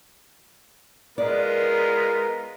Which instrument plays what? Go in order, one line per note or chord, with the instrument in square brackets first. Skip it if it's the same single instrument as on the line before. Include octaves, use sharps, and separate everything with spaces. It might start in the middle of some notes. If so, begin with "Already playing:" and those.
[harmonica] G#3 B3 F4 [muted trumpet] A#4 [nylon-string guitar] D5